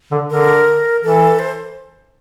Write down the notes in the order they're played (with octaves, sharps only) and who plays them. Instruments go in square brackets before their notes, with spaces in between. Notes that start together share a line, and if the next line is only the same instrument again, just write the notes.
[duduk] D3
[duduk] D3 [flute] A#4
[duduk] E3 [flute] A4
[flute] C5